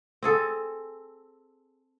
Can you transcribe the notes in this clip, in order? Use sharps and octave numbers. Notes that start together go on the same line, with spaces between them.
C4 G#4 A4